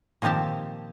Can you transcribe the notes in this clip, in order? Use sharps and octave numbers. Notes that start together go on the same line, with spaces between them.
A#2 D#3 F3 C4 G4 A5